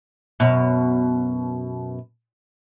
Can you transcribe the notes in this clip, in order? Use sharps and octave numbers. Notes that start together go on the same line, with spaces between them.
F#2 B2